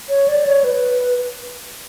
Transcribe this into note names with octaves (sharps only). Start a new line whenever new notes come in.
C#5
D5
C#5
B4